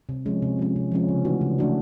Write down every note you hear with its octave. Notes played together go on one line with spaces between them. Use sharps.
C3
F3 G#3 C#4
C3
F3 G#3 C#4
C3
F3 G#3 C#4
C#3
E3 A3 D4 F#4
C#3
E3 A3 D4 F#4